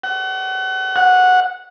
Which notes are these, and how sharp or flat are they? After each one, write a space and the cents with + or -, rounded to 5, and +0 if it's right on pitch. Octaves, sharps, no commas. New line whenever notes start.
F#5 +35
F#5 -10